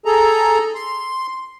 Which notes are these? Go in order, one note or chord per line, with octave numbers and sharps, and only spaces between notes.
G#4 A4 A#5
C6